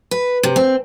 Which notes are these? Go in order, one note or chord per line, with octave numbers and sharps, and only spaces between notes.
B4
C3
C4